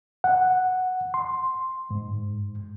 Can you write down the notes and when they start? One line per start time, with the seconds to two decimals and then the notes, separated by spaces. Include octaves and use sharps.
0.24 F#5
1.14 C6
1.91 G#2